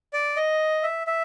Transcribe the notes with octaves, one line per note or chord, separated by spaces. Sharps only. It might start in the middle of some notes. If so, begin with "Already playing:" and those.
D5
D#5
E5
E5